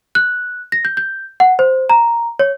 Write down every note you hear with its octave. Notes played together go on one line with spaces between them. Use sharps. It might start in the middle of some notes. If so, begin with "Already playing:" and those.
F#6
A#6
G6
G6
F#5
C5
A#5
C#5